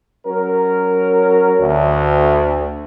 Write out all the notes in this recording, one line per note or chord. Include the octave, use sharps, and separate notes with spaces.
F#3 C#4 A#4
D2